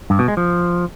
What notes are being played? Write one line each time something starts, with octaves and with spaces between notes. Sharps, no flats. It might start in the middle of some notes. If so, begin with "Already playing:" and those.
G2
B2
G#3
F3